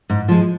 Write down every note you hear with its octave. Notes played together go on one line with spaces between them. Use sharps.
G#2
F3 G#3